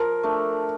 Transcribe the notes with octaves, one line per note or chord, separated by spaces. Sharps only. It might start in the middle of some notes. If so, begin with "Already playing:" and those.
Already playing: F3 A#4
A3 D4